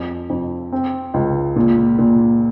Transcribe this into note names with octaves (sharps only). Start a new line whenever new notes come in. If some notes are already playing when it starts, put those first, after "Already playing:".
Already playing: F2
F2
C4
C#2
A#2
A#2